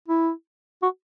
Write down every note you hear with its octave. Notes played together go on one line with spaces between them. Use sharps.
E4
F#4